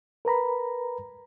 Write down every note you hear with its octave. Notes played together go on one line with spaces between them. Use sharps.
A#4 B4 A#5 B5